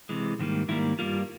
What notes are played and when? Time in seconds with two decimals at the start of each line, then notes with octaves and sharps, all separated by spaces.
0.09 C3 E3 G#3
0.39 G#2 D#3 G3 A#3
0.68 G#2 D#3 G3 A#3 E4
0.99 G2 D#3 G3 A#3 F4